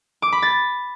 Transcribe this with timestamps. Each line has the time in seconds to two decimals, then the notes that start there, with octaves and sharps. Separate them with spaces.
0.22 D6
0.32 B5
0.42 A6